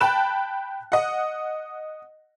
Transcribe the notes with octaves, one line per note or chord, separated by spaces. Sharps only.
G5 A5 B5 F#6 E7
D#5 F#5